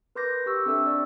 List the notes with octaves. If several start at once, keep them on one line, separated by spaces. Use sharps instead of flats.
A#4 B4 C6 D6 G6 A#6
G4 C#6 E6
C4 D4 A4 E5 E6
D5 C#6